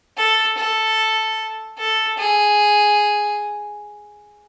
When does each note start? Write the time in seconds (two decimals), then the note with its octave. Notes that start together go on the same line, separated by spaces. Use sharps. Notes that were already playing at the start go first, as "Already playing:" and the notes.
0.17 A4
0.57 A4
1.79 A4
2.19 G#4